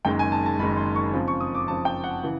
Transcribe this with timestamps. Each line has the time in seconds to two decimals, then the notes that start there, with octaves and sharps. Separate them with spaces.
0.05 F#1 F#2 D#3 G#3 G5
0.19 G#5
0.32 A5
0.46 A5
0.59 F#1 F#2 D#3 G#3 B5
0.77 C6
0.96 C#6
1.13 F2 C#3 F3
1.28 C#6
1.41 D#6
1.55 D6
1.68 F2 C#3 F3 A5
1.85 G5
2.04 F#5
2.23 C#3 E3